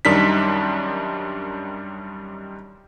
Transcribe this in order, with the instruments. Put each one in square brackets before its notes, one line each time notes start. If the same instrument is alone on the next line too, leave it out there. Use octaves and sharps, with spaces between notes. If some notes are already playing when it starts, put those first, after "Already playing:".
[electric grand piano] F#2 D#3 G3 D4 D#4 B6